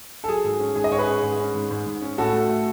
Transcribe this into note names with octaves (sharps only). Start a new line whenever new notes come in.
A4
F#3 G#4
G#2
C#4
G#2 G#4
D#5
G#2 C#5
G#4 B4
C#4
G#2
C#4
G#2
G#2
G#2
C#4
A2 F#4 A4
A3
A3